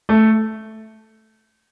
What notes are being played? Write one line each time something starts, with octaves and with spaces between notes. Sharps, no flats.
A3